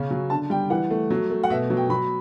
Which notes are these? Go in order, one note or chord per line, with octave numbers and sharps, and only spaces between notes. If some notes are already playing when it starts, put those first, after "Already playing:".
Already playing: C#3 C#4
F#3
D3 A5
G3 G5
E3 F#5
A3
F#3
A3
F#5
B2 E5
F#3
G5
F#3 B5